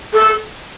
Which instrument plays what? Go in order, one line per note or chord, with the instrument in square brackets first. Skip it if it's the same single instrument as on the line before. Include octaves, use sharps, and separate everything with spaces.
[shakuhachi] A4